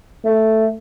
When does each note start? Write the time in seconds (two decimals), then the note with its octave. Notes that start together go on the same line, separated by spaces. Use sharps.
0.25 A3